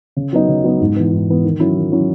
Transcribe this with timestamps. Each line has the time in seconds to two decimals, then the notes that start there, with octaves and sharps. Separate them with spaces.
0.16 C#3
0.33 F#3 B3 D#4
0.48 C#3
0.64 F#3 B3 D#4
0.81 G#2
0.96 E3 B3
1.13 G#2
1.29 E3 B3
1.44 D#3
1.60 F#3 C#4 E4
1.76 D#3
1.92 F#3 C#4 E4